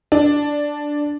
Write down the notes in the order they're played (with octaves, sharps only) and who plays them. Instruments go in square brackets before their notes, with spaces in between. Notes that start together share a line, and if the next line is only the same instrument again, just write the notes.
[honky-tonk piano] D4